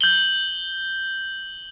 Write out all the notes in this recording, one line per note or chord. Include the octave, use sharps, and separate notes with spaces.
G6 F#7 G7